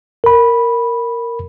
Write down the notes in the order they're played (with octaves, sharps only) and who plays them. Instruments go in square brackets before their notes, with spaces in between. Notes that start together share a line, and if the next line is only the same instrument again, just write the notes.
[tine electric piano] A#4 B5